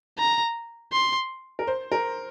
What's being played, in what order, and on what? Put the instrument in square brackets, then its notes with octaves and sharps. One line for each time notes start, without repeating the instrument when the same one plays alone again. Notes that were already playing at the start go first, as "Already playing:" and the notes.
[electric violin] A#5
C6
[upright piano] A#4
C5
A#4